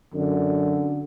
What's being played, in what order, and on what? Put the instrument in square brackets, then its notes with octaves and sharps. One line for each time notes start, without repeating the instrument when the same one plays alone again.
[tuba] F#2 [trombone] D3